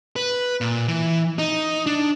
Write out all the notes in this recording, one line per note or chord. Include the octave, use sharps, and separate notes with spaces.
B4
A#2
E3
D#4
D4